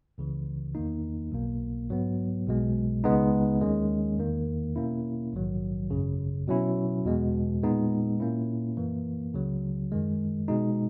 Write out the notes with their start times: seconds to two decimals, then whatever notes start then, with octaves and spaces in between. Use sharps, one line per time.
0.18 C#2 C#3 E3
0.75 E2 D#3 A#3 D#4
1.32 B1 B2 A#3
1.90 G#2 F#3 B3
2.46 B1 B2 G#3
3.04 C#2 C#3 G#3 B3 D#4
3.61 D#2 D#3 G#3 C#4
4.18 E2 D#3 A#3
4.76 B2 A#3 C#4 E4
5.33 A#1 G#2 D#3 F#3
5.90 G#1 F#2 C#3
6.47 B2 F#3 C#4 E4
7.05 E2 B2 G#3
7.63 A#2 G#3 B3 D#4
8.20 A#2 A#3 C#4 E4
8.77 F#2 E3 A#3
9.34 C#2 C#3 F#3
9.92 F#2 D#3 G#3
10.48 B2 G#3 D#4